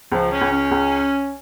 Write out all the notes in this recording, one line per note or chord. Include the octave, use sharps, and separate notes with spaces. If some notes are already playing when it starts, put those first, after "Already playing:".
C#2 F3
C#4
C#2
C#4
C#2